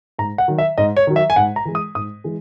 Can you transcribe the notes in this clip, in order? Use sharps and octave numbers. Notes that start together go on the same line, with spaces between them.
G#2 A#5
F#5
D#3 F#3
E5
G#2 D#5
C#5
D#3 F#3
E5
G#5
G#2 F#5
A#5
E3 G#3
D#6
G#2 D#6
E3 G#3